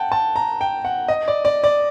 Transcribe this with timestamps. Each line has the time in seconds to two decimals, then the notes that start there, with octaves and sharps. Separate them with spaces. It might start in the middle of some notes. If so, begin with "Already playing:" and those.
Already playing: F#5 G5 A5
0.12 A5
0.36 A#5
0.61 G5
0.85 F#5
1.08 D#5
1.28 D5
1.45 D5
1.64 D5